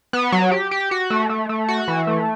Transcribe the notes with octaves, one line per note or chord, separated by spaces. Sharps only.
B3
F#3
G4
G4
F#4
A3
A3
A3
F#4
E3
A3